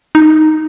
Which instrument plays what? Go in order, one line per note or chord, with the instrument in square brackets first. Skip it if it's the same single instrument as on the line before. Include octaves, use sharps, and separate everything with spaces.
[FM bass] D#4